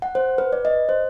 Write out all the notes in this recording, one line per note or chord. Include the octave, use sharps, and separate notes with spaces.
F#5
C5
B4
D5
D#5
C5